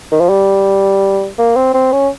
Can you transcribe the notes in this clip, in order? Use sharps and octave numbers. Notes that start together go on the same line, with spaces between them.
D#3
F3
G3
A#3
C4
C4
C#4